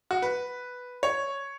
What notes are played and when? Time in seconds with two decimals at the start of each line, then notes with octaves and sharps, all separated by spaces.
0.11 F#4
0.22 B4
1.03 C#5